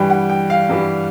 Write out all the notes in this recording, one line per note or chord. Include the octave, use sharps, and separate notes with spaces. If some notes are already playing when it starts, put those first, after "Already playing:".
Already playing: G2 E3 G3 G5
F#5
G5
F5
G2 E3 G3